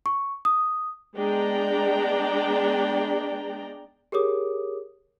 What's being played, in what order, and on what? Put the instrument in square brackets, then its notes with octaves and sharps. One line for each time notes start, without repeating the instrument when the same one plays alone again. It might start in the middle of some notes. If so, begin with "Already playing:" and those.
[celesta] C#6
D#6
[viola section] G#3 B3 D4 D5 G5 A#5
[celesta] G4 G#4 A#4 C#5 D6 D#6